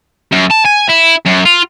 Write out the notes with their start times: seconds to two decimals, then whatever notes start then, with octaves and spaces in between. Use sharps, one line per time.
0.32 F#2
0.51 A5
0.66 G#5
0.90 E4
1.26 F#2
1.46 F4